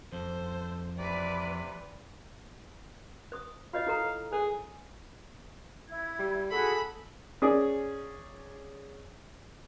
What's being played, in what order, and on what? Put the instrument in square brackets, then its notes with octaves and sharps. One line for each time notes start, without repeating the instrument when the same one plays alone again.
[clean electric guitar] F2 [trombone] A4 [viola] C5
[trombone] C3 [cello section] E3 B4 [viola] D5
[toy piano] C5 D#6
[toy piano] F4 C#5 D#5 [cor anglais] F5
[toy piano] E4 A4 A#5
[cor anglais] G#4 [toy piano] C5
[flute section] E4 G#6
[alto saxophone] G3
[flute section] F#4 G#4 [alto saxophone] A4 [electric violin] B5
[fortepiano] C#4 G#4 D5